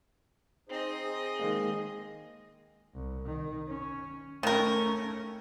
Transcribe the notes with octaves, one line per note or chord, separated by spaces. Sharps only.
C4 D#4 G#4 C5 D#5
G#4
D#3 G#3 A#3
C2
D#3
C#4
D#3 A3 C#4 A#4